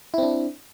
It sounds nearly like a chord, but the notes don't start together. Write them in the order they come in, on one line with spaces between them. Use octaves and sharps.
E4 C4 D4